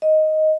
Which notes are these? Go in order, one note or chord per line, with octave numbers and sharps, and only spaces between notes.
D#5